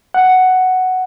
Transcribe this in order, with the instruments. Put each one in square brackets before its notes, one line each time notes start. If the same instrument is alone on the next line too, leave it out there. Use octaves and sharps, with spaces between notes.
[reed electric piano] F#5